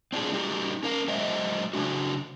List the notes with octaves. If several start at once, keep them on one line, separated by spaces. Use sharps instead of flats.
C4 D4 F4 F#4 G#4
G3 D#4 F#4 G4
C#4 A#4 F5
F#3 G#3 C5 D#5 E5
C#3 F#3 D4 F#4